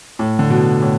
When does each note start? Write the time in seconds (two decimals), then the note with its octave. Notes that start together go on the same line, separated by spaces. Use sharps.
0.19 A2
0.39 D3
0.50 B2
0.82 A2